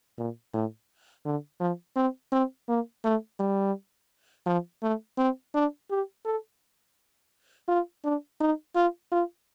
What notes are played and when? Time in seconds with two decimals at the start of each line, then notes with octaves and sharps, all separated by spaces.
0.18 A#2
0.54 A2
1.25 D3
1.60 F3
1.96 C4
2.32 C4
2.68 A#3
3.04 A3
3.39 G3
4.46 F3
4.82 A3
5.18 C4
5.54 D4
5.90 G4
6.25 A4
7.68 F4
8.04 D4
8.41 D#4
8.75 F4
9.12 F4